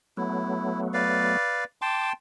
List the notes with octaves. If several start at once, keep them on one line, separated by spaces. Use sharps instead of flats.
F#3 A3 B3 E4
B4 D5 F5
G5 A5 C6 D6